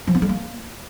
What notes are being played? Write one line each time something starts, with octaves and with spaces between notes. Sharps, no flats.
F3
B3
G#3
A#3